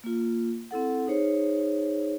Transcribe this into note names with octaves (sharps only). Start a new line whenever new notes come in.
A#3 F4
C4 E4 A4 F#5
D#4 G#4 C5 C#5